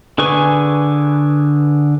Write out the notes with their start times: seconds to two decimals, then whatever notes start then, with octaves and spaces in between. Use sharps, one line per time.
0.18 D3 G#4 B4 G#5 C#6